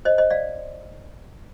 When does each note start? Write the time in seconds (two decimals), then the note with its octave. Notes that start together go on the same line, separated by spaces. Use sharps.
0.05 C5 D#5
0.18 C5 D#5
0.30 D5 F5